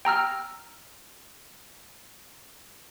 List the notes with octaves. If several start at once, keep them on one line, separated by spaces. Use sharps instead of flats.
G5 A#5 E6 F6